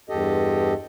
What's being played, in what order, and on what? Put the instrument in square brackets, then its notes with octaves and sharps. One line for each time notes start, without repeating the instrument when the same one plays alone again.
[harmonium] E2 G2 G4 A4 D#5